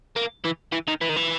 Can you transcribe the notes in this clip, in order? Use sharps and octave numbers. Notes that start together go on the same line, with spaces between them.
A#3
E3
E3
D#3
E3
D#3
E3